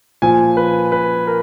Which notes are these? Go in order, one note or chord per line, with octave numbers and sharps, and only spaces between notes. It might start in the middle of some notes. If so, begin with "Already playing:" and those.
A#2 F3 G#5
B4
B4
A#4